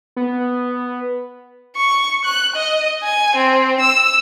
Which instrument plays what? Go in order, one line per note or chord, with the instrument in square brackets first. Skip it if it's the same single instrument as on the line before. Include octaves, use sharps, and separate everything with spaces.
[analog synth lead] B3
[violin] C#6
F#6
D#5
G#5
C4
E6